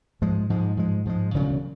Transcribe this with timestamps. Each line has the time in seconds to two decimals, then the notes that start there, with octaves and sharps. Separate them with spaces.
0.22 G#2 F3 G#3
0.50 G#2 F3 G#3
0.77 G#2 F3 G#3
1.06 G#2 F3 G#3
1.34 E1 D2 C#3 F#3